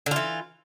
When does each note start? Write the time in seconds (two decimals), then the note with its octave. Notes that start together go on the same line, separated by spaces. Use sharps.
0.06 D3
0.11 F4
0.16 E3